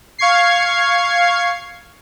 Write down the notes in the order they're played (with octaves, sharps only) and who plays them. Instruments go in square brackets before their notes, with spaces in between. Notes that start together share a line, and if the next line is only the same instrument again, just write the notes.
[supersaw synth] F5 C#6 G#6 C7